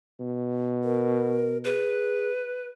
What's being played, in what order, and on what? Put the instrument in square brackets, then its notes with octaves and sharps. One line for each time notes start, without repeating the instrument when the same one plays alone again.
[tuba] B2
[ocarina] A#4
[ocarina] G#4 [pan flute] B4